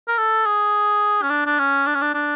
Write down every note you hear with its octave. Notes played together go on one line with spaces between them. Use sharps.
A#4
A4
G#4
C#4
D4
D4
C#4
D4
C#4
D4
D4